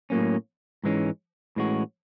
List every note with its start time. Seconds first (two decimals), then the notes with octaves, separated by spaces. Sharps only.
0.10 A2 F#3 A#3 C#4
0.84 G#2 E3 G#3 C#4
1.56 A2 E3 G#3 C#4 F#4